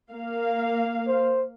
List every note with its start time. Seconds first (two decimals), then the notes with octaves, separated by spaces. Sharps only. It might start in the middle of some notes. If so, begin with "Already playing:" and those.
0.11 A#3 F5
1.07 C5